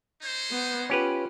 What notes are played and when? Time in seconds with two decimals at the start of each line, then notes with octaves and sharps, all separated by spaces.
0.22 C#4 D#4 C5
0.51 B3
0.90 C#4 F4 G4 B4